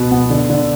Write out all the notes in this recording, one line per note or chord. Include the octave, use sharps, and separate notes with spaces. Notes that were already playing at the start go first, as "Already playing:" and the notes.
Already playing: B2 B3
B3
D3
D3